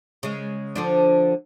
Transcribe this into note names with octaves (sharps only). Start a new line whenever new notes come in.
C#3 G#3
D3 F3 D4